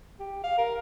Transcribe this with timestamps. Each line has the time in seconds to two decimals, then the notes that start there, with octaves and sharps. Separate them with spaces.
0.20 G4
0.44 F5
0.58 A#4